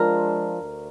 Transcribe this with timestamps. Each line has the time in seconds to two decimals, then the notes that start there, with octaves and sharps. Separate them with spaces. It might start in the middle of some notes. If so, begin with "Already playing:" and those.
Already playing: F3 G#3 D4 F4 A#4
0.61 D2